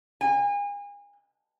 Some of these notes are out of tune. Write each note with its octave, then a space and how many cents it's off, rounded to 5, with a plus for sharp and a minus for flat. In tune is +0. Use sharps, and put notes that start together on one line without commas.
G#5 -35